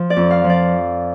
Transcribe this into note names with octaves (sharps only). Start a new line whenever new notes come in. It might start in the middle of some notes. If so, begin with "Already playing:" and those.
Already playing: F3
D5
F2
F5
F3
D5